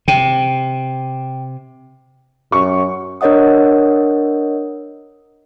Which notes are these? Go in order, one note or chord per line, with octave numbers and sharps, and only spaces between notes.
C3 G5
F#2 C#6
D4 A#4 C#5 D#5 F#5 D#6